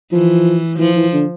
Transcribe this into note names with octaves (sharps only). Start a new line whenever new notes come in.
E3 F3
E3 F3
E3
D3